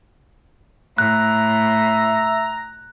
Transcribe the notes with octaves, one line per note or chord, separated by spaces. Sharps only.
A2 E5 A#5 F#6